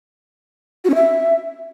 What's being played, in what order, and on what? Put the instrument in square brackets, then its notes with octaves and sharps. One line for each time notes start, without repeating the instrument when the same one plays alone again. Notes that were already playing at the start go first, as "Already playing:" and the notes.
[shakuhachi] F#4
C#4
E5